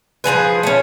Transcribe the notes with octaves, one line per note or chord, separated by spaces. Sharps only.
F3 G3 G#4 B4
A3 C#4